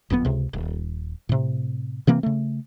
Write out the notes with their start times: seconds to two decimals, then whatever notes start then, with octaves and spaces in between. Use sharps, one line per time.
0.10 F#1 F2 A2 B3
0.25 C#2 C3
0.53 D#1
1.29 A2 C3
2.07 C3 E3 A#3 C4
2.23 C#3 A3